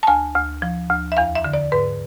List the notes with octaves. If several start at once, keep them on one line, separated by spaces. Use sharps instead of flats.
A5
D2 G#5
D2
F3
D2
E5
E2 F5
E5
D3
D5
G#2 B4